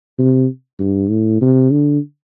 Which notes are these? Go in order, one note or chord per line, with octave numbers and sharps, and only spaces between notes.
C3
G2
A2
C3
D3